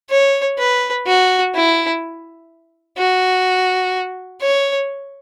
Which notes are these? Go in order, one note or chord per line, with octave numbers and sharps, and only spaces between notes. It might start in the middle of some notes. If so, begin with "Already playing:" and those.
C#5
B4
F#4
E4
F#4
C#5